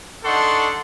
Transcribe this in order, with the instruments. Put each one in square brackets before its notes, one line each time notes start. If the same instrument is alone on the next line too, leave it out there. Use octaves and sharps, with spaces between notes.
[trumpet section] D4 D#4 A4 F#5 C6 C#6